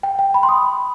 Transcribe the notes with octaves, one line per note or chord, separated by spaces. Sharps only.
G5
G5
B5
C6
D#6